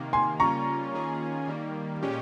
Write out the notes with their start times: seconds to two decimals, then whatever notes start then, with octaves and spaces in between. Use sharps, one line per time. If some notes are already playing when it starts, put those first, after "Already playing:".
Already playing: C3 D#3 A#3
0.13 G#5 C6
0.40 C#3 G3 A#3 C#4 F4 A#5 C#6
0.93 D#3 A#3 C#4 F4 G#4
1.48 D#3 G3 A#3
2.02 A#2 G#3 C#4 G4